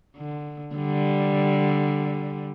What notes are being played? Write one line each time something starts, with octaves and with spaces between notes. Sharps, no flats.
D3
D3 G3